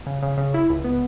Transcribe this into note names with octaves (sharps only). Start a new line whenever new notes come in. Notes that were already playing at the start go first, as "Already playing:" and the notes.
C#3
C#3
C#3
E4
C#2
B3